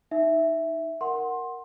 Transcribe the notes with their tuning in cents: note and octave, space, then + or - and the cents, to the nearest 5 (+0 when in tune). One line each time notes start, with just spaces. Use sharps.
D#4 +0 E5 +0
A#4 +0 F#5 +0 C6 +15